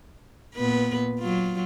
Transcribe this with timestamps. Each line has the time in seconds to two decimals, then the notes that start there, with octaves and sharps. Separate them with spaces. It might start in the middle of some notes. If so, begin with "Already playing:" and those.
0.55 A#2 B3 B4
1.20 F#3 F4